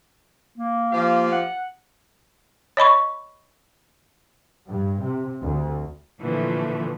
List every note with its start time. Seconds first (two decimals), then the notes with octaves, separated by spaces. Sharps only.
0.58 A#3
0.92 F3 G4 F5
1.32 F#5
2.77 C#5 D#5 B5 C#6
4.69 G2
5.03 C3
5.41 D2
6.19 A#2 D3 E3 F3 A3